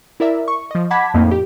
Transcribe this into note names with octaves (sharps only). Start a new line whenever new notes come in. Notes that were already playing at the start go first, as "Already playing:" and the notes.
E4 A#4 D5 E5
C#6
F3 D#5
F#5 A5 B5 D6 G#6 B6
F2 A2 A#3 D#4
G4